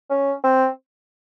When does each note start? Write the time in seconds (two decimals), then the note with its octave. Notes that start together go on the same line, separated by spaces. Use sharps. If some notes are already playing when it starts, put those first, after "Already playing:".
0.10 C#4
0.44 C4